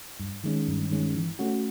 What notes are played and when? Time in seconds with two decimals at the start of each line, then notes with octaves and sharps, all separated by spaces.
0.20 G2
0.44 D#3 G#3 C#4
0.68 G2
0.91 D#3 G#3 C#4
1.15 E3
1.39 A3 C#4 F#4